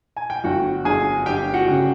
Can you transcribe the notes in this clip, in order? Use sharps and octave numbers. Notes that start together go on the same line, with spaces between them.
G#5
G5
G1 F#4 F#5
G1 G#4 G#5
G1 G4 G5
F#4 F#5
C#3